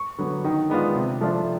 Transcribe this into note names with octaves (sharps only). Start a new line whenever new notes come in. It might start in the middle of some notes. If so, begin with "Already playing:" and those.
Already playing: C#6
D3 F#3 B3
D#3
G#3 B3 D4 F4
C3
F3 A3 D4 F4